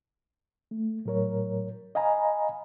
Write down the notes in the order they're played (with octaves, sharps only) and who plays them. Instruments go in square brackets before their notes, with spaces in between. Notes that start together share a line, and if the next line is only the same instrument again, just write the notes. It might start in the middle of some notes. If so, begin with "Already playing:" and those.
[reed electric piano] A3
A2 F#3 A#4 C#5
D#5 F5 G#5 A#5 B5